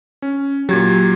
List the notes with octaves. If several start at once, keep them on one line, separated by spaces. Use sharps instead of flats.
C#4
A#2 F#3 G4 G#6 A6